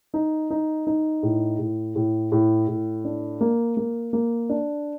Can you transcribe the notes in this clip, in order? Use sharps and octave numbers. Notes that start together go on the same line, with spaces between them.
D#4
D#4
D#4
A2
A2
A2
A2
A2
D4
A#3
A#3
A#3
D4